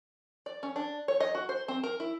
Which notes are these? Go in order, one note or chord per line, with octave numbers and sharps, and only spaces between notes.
D5
C#4
D4
C#5
D#5
F#4
C5
C4
A#4
E4